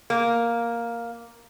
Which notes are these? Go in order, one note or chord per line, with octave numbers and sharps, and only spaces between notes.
A#3